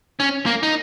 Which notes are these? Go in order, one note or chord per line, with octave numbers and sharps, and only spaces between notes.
C#4
A#3
D#4